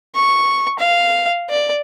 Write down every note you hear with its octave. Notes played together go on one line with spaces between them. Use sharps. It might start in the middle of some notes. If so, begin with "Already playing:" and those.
C#6
F5
D5